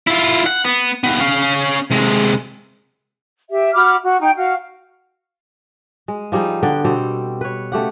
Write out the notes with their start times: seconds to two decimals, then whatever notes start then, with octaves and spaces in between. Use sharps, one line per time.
0.07 E4 F4
0.46 F#5
0.65 B3
1.04 D#2 B3
1.20 C#4 F5
1.90 C3 G#3
3.49 G4 E5
3.74 F#4 B5 D6 F6
4.02 F#4
4.20 D#4 G5
4.35 F#4 F5
6.08 G#3
6.32 F3 G3 D#4 G#4
6.63 D3 B3 D5 G5
6.85 B2 G3 C4 A4
7.41 B4 C#5
7.72 C#3 A3 G4 F#5